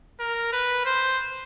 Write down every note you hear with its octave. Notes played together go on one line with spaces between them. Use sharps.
A#4
B4
C5